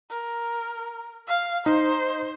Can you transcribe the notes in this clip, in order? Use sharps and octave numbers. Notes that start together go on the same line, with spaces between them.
A#4
F5
D#4 C5